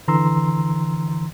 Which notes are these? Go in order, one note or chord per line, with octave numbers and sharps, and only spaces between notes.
D3 E3 A#5 C6 E6